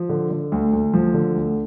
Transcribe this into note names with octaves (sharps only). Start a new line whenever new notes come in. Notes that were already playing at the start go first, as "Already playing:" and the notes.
Already playing: F3
D3
D3
D2
D2
F3
D3
D2